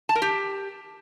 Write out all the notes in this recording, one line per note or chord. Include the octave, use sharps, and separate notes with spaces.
A5
A#4
G4